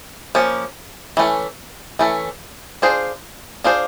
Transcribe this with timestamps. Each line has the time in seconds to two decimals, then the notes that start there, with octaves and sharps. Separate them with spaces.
0.35 F3 A#3 C#4
1.17 E3 A3 C#4
1.99 E3 A3 C#4
2.82 D4 F4 G#4 C5
3.64 D4 F4 G#4 C5